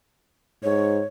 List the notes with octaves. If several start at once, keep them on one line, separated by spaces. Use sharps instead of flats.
G#2 C#5